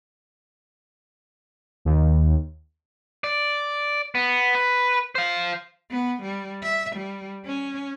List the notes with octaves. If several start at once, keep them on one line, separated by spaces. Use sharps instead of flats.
D#2
D5
B3
B4
C5 F5
B3
G3
E5
G3
C#4